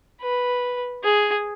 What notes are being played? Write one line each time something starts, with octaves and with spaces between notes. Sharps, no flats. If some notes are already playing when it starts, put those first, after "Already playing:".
B4
G#4